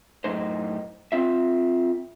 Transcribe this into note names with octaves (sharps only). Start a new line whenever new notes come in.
F#2 A2 G#3 D#4 C5
C4 F4 E5